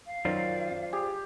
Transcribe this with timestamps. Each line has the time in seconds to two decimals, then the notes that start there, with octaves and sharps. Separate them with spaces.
0.06 F5
0.25 F#2 D#3 F#3 F4 C5 D5
0.93 G4 G#4